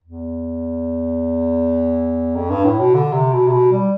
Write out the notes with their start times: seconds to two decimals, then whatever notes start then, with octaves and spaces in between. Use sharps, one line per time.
0.04 E2
2.36 F2
2.50 G2
2.65 A2
2.80 B2
2.95 D3
3.13 C3
3.33 B2
3.47 C3
3.52 B2
3.72 G3